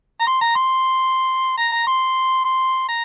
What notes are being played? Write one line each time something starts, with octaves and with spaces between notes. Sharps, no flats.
A#5
C6
A#5
C6
A#5
A#5
C6
C6
A#5